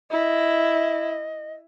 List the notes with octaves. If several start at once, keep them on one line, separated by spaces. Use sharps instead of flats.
E4 D#5